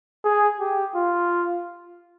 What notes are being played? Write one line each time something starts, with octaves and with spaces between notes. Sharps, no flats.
G#4
G4
F4